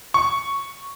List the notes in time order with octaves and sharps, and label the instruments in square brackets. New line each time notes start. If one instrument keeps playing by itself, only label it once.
[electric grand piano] C#6